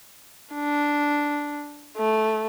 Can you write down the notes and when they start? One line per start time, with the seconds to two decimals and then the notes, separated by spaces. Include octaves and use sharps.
0.54 D4
1.97 A3